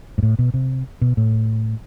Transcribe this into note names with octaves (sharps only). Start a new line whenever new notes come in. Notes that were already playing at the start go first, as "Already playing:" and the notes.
G#2
A2
B2
C3
B2
A2